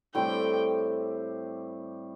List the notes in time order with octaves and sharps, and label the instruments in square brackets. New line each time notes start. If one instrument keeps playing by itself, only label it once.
[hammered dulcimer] A2 G3 C4 G4 [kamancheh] G5